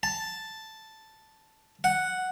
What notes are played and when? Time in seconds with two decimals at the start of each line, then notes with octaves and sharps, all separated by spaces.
0.03 A5
1.84 F#5